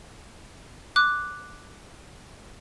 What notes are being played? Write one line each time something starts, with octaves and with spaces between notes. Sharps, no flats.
D6 F#6